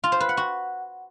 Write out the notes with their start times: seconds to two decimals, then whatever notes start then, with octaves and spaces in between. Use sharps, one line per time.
0.04 F4
0.12 C5
0.20 B4
0.29 F#5
0.37 F#4